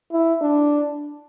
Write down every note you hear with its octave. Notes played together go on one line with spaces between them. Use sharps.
E4
D4